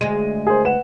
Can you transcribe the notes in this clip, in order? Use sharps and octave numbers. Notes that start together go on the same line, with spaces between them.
D2 G#3 D#7
G#4 A#4 C5
B4 F#5 E7